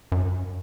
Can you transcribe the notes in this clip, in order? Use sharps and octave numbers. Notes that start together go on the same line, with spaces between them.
F#2